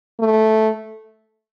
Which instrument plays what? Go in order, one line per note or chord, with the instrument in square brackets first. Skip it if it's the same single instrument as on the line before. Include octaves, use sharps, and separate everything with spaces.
[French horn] A3